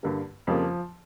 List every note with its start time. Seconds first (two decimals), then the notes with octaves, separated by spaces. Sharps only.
0.03 G2 D3 G3 A#3
0.47 F2 C#3 F3 G3 A#3